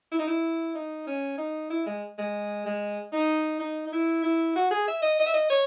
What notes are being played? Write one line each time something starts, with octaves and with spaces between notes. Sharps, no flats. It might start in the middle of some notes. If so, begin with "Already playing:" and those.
E4
D#4
E4
D#4
C#4
D#4
E4
G#3
G#3
G#3
D#4
D#4
D#4
E4
E4
F#4
G#4
E5
D#5
D#5
E5
D#5
C#5